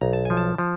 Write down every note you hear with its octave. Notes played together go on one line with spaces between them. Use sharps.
B1 A#5
A5
F3 G#5
A5
F3